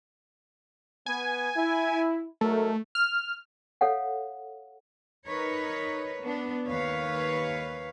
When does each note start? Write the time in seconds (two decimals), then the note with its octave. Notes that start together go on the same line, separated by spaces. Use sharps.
1.06 B3 G#5
1.56 E4
2.41 G#2 F#3 A3 A#4
2.95 F6
3.81 A4 C#5 F5 F#5
5.27 D#4 A#4 B4 C#5
6.23 B3 D4
6.66 D#2 B4 C#5 F5